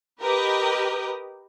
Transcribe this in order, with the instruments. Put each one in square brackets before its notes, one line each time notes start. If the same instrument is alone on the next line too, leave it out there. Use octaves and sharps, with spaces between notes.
[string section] G4 A#4 B4 D#5